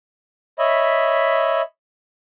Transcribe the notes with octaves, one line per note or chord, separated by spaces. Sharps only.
C#5 D#5 E5 B5